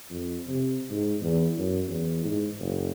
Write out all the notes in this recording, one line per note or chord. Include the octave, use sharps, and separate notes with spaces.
F2
C3
G#2
E2
F#2
E2
G#2
F#1